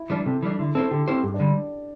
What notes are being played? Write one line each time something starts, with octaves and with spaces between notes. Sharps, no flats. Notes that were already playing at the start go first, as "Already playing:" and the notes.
Already playing: E4
E3 G3 D4
C3 A4
E3 G3 D4
D3 E4
C4 E4 A4 C5
D3 G4
C4 E4 G4 C5
G2 G4
D4
D3 G3